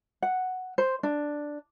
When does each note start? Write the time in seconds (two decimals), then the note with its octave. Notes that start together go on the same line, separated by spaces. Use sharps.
0.22 F#5
0.78 C5
1.03 D4